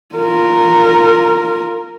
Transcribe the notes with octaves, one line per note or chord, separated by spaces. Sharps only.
F4 A#4